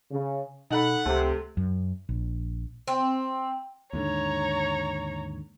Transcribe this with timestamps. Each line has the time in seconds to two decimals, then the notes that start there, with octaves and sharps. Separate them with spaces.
0.11 C#3
0.70 B2 D#4 A4 F#5 B5
1.06 C#2 C3 A3
1.57 F#2
2.09 A#1
2.88 C4
3.93 D#2 G#2 D3 C#5 A#5